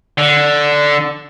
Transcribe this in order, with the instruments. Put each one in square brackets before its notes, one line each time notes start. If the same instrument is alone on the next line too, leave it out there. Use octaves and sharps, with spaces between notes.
[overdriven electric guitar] D3